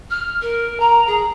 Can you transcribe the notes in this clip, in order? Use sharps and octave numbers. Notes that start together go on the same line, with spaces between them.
F6
A#4
A#5
G#4